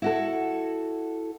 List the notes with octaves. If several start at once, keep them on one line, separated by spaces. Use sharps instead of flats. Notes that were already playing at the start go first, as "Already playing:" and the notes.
E4 F#4 A4